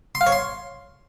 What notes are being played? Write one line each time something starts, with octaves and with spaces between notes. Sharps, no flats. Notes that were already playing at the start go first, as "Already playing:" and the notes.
C6
F5
C#5
C6